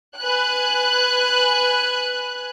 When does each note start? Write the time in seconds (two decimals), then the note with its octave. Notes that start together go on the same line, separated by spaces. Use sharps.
0.18 B4 G#5 F#6